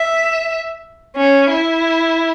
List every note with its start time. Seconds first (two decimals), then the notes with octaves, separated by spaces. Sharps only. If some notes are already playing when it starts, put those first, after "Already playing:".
Already playing: E5
1.17 C#4
1.51 E4